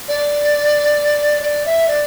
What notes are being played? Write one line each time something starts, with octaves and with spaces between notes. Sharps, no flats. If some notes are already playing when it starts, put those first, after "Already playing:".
D5
D5
E5
D5